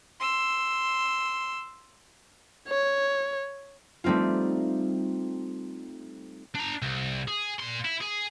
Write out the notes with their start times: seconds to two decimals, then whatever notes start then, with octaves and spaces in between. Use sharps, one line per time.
0.20 C6 E6
2.69 C#5
4.04 G3 A3 C4 D#4 F4
6.55 D4 A#5
6.82 C2
7.28 G#4
7.59 A#2 C6
7.85 E4
8.01 G#4